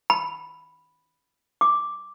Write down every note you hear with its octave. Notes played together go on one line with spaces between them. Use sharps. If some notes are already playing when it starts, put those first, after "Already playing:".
B5
D6